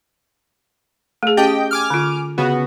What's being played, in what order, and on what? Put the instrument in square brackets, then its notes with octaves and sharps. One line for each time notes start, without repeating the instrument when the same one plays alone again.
[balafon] A3 G#4
[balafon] C#4 [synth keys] G4 D#5 G5
[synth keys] G#5 D6 F6
[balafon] D3 F4
[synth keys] C#3 B3 F#4